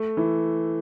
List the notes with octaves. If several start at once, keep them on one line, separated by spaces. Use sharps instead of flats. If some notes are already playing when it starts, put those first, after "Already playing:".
Already playing: A3
E3